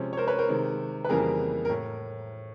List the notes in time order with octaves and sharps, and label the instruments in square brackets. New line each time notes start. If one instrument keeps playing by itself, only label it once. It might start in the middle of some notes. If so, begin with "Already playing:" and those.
Already playing: [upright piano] C3 F3 G#3 C#4
C#5
A#4 C5
B4 C#5
A#4 C5
C3 D#3 G#3
B4
F2 C#3 E3 G3 A#3 G#4 A#4
A#4
A2